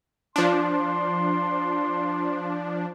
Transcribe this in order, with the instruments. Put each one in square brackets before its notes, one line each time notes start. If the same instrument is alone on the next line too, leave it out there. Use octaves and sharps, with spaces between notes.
[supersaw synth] F3 D4 [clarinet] C6